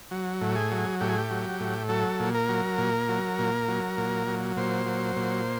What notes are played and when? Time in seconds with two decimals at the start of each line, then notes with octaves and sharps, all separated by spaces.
0.11 F#3
0.41 A2
0.55 G#4
0.71 F#3
1.00 A2 G4
1.09 G#4
1.18 G4
1.31 F#3
1.60 A2
1.89 F#3 A4
2.20 A#2
2.34 A#4
2.49 F#3
2.78 A#2
3.09 F#3
3.39 A#2
3.68 F#3
3.97 A#2
4.27 F#3
4.57 A#2 C5
4.86 F#3
5.16 A#2